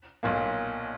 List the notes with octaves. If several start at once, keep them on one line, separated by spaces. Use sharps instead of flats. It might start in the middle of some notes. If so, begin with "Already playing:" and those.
B1 A#2 A#3